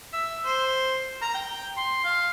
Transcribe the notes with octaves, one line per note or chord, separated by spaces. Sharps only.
E5
C5
A#5
G5
C6
F5